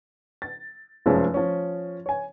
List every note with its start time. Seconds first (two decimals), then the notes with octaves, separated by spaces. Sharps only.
0.42 A6
1.06 F1 F#2 F3 G#3 C#4 A5
1.34 F3 C#4
2.06 C#5 G#5